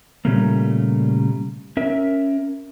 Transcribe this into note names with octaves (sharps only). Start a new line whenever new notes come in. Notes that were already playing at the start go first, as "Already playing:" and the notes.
A#2 C#3 G3 A3 A#3
C#4 A#4 E5